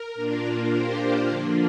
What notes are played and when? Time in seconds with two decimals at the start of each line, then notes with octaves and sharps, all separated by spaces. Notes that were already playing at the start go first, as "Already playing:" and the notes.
Already playing: A#4
0.14 A#2 A#3 D4 F4
0.71 G4 C5
1.29 D3 F3 A#3 D4 F4